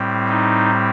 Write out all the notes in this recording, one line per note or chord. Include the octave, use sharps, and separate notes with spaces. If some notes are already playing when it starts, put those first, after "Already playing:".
Already playing: A2 G3 C4
D#4